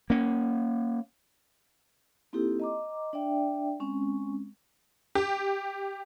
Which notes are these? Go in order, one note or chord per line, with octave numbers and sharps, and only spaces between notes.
A#3 C#4
A#3 C4 D#4 E4 G4 A4
D#5 A#5 D6
D4 D5 E5 G5
G#3 C4 C#4
G4